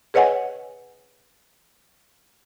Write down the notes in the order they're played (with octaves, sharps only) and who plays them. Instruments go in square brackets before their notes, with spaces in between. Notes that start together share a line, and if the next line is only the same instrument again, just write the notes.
[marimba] G#4 B4 C#5 D#5 F#5 G#5